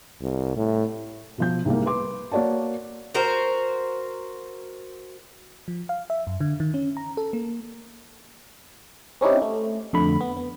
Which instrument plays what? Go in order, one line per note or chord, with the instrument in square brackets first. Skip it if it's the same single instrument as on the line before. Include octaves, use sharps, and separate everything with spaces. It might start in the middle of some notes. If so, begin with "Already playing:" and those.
[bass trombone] C2
A2
[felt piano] B2 F3 G6
C2 G#2 A#3
B4 C6 D6
A#3 F#4 C#5 D5 A5
[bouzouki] F#4 A#4 C5
[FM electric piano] F3
F5
E5
F#2
D3
D#3
C#4
A#5
A4
A#3
C4 C#4 D#4 E4 G4
A3
F2 D3 A3 B5
B3
B3